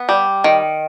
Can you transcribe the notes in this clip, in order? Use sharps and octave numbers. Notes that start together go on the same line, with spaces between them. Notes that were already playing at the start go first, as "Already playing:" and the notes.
Already playing: B3
G3
D#3